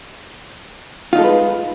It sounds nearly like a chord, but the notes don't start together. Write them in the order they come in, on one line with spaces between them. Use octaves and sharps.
F4 D#4 A4 G#3 B4